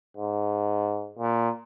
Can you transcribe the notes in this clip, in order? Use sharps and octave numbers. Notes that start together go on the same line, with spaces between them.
G#2
A#2